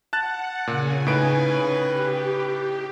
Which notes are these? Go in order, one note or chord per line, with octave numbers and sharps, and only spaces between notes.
F#5 A5 F#6 A6
A#2 C#3 G#5
A2 D#4 B4 D7
G4